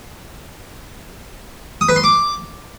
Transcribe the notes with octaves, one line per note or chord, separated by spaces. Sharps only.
D#6
B4
C6
D6